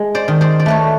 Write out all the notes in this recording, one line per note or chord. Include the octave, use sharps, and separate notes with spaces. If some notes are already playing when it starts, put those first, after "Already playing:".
Already playing: G#3
C5 D5
D#3
C5 D5
D5
A3 B4 C#5